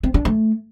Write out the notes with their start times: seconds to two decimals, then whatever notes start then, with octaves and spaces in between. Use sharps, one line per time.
0.03 C4
0.14 D4
0.25 A3